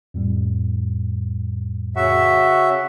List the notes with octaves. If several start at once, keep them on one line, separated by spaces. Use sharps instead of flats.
F2 A2 G3
C#3 F#4 E5